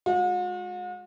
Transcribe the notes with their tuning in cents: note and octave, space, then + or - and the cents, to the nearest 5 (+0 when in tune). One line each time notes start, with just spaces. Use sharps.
G#3 +0 F#4 -45